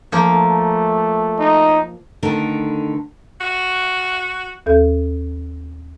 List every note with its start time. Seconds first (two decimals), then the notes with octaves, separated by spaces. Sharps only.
0.12 F3 A3 A#3
1.39 D#4
2.23 D3 D#3 A3 A#4
3.40 F#4
4.66 D#2 A4 G6